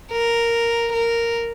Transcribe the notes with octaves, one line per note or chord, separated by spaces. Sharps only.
A#4
A#4